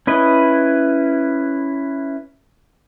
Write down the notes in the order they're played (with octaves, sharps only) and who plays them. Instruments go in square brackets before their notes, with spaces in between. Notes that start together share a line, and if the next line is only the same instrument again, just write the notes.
[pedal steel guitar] C#4 E4 B4 D#5